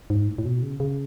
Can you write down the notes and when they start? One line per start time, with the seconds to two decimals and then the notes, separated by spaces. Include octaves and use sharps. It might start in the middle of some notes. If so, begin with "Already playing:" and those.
0.10 G#2
0.28 A2
0.38 A2
0.45 B2
0.63 C#3
0.80 C#3